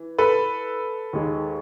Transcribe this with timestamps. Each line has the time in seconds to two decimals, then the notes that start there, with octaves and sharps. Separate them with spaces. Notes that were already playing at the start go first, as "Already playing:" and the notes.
Already playing: E3
0.18 A4 B4
1.13 D#2 D#3 G#3